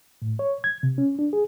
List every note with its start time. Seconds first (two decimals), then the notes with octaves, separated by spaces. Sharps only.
0.22 A2
0.39 C#5
0.64 G#6
0.83 C3
0.98 C#4
1.19 D4
1.33 G#4